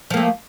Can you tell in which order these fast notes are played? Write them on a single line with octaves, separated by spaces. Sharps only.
F3 A#3 A3